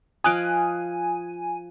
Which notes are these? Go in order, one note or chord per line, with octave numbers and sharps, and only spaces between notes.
F3 D#5 F5 G#5 D#6 F#6 D7